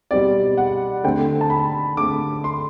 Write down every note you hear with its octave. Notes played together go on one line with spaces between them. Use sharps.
B2 G3 C4 D5
F#5
D3 A3 C4 G5
A5
B5
D3 A3 C4 D6
C6